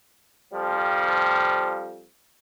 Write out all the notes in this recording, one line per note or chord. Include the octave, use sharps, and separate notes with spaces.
F2 F3 G3